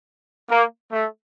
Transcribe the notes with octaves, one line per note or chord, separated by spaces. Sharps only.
A#3
A3